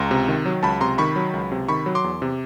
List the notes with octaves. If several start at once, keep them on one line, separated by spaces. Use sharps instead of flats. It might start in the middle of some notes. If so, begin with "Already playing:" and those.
Already playing: C#2 A#5 C6
C3
D#3
F#3
C#2 A5 B5
C3 A#5 C6
D#3 B5 C#6
F#3
C#2
C3
D#3 B5 C#6
F#3
C6 D6
E2
C3